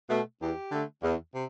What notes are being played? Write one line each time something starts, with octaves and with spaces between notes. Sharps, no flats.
B2 A3
E2 G4
D3 A3
E2
C3